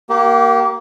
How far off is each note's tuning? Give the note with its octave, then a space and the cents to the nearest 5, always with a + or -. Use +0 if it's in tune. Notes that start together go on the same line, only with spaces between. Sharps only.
A#3 +5 G4 -30